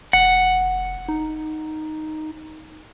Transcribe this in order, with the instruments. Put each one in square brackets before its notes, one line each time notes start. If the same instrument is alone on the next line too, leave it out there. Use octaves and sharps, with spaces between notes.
[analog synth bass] F1 [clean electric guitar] F#5
[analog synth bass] D#4